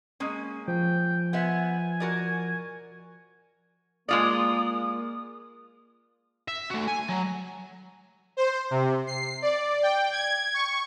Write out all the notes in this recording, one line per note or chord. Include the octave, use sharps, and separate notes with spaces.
G#3 A#3 C#4
F3 G5
B3 C5 E5 G#5
F#4 A#4 D5
G#3 A#3 F4 D5 D#6
E5
A3 F#4
G#5
F#3
C5
C3
C7
D5
G5
G#6
C#6